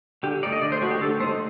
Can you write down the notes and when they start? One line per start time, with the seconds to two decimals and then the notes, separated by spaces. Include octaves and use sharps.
0.23 D3 G4
0.43 A3 D#4 D5
0.52 D#5
0.62 D3 D5
0.72 C5
0.81 A3 D#4 F#4
0.91 G4
1.01 D3 A4
1.20 A3 D#4 C5